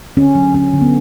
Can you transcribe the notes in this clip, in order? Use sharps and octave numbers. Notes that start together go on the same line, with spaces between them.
D3 C#4
F#3
D3 C#4
D3
B3